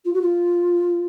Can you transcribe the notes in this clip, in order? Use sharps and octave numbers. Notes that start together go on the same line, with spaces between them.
F4
F#4
F4